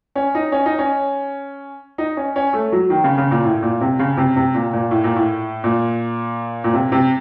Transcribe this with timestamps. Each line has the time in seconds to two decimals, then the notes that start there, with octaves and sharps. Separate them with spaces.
0.16 C#4
0.35 D#4
0.52 C#4
0.66 D#4
0.78 C#4
1.98 D#4
2.17 C#4
2.36 C#4
2.53 A3
2.72 F#3
2.90 D#3
3.04 C#3
3.18 C#3
3.31 A#2
3.45 A2
3.63 A#2
3.81 C3
3.99 C#3
4.17 C3
4.36 C3
4.55 A#2
4.73 A#2
4.91 A2
5.04 A#2
5.16 A2
5.64 A#2
6.64 A#2
6.73 C3
6.92 C3